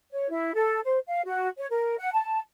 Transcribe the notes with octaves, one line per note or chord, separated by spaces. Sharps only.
C#5
E4
A4
C5
F5
F#4
C#5
A#4
F#5
A5